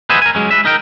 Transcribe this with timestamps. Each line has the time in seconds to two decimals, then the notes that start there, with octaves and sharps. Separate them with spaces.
0.10 B4 C5 D#5 E5 F#5 G#5
0.22 A#4 G#5
0.35 F#3 G#3 C#4
0.51 B4 E5
0.65 D#4 A#4 G5